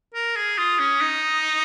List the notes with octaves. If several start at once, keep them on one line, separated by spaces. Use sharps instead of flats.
A#4
G#4
F4 D#6
C#4
D#4